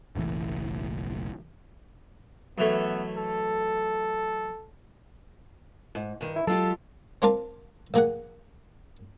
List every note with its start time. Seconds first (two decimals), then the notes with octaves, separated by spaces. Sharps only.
0.16 F#1 B1 A2 E3
2.58 F#2 E3 A3 B3
3.16 A4
5.95 G#2
6.21 G2 D#3
6.36 E4
6.47 F#3 G#3 F4 G4 A4
7.22 C4 D4 F4 A#4 F5 A5
7.94 A#1 A#3 G#4 F#5